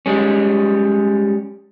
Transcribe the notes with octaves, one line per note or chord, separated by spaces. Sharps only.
G3 G#3 C#4